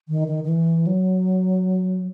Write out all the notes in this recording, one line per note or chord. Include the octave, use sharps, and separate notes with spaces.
D#3
D#3
D#3
E3
F#3